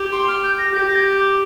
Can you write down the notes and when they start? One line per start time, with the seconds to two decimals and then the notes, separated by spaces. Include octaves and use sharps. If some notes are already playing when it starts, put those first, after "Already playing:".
Already playing: G4
0.12 C6
0.28 F6
0.43 G6
0.59 A#6
0.73 G4 G6
0.88 A#6
0.96 G6
1.19 D6